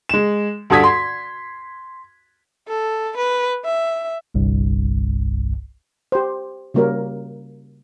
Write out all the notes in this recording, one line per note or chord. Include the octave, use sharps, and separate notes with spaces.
G#3 E7
D2 G2 A4 D#6 G#6 B6
C6
A4
B4
E5
G1 C2 G2
G4 C5
C#3 G3 A#3 F#4 A#4 C#5